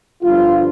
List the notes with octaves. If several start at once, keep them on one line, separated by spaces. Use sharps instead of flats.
G1 G2 F3 F4